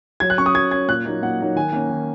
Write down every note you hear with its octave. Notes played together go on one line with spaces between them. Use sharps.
F#3 G#6
F#6
C#4 C#6
D#6
F#3 G#6
C#4 G#6
A#2 F#6
F#3 A#3 D#4
A#2 F#5
F#3 A#3 D#4
D#3 G#5
A#3 C#4
D#3